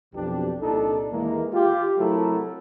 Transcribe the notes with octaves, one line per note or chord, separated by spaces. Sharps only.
B1 F2 B2 D4 G4
C2 A#2 D4 D#4 A4
D#2 E3 G#3 A#3
F4 G4
C3 F#3 A3 E4 A4 A#4